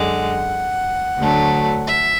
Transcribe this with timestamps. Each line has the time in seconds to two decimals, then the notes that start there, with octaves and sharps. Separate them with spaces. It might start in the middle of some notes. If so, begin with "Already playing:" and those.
Already playing: F#2 D3 G#3 F#5
1.17 D2 D3 F#3 A3
1.87 E5